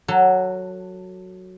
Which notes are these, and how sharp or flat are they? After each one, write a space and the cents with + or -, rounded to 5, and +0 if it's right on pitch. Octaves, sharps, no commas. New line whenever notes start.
F#3 +0 A4 +20